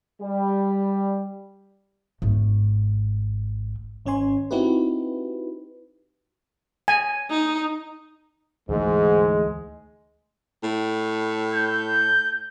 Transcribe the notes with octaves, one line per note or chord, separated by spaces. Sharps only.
G3
G#1 A3
G#1 C#4 C#5 G#5 C6
C4 D#4 E4 F#4 G4 B4
G#5
D#4
D2 G#2 E3 G#3 A3
A2
G6